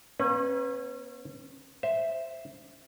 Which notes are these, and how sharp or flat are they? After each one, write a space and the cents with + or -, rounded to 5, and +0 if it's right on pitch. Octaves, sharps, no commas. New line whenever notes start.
A#3 +45 C#4 -40 B4 +0
C5 +0 E5 +5